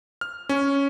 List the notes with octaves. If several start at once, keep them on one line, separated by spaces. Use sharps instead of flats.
F6
C#4